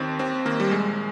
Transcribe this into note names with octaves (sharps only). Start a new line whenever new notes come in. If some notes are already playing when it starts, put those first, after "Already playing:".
Already playing: D#2 D#3 C4
D#2 C4
D#3 A#3
G3
A#1 G#3